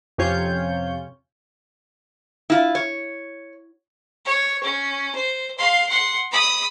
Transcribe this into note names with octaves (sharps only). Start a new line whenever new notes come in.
F2 C3 C#4 F4 C#5 G6
E4 F4
C#5
C#5
C#4
C5
F5 C6
F#5 C6
B5 D#6